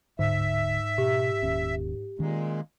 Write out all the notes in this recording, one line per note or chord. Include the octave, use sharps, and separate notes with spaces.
D1 G#2 D3 E5
B2 G4
D#1 D#2 C#4
A#2 D#3 G#3 C#4